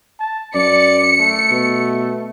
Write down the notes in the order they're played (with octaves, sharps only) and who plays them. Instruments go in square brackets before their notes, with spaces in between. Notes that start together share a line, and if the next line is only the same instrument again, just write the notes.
[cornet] A5
[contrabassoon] F#2 [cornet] D5 [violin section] C#7
[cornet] A3
[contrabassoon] B2